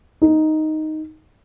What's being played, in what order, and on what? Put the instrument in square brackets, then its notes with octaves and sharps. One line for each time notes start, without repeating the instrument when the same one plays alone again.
[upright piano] D#4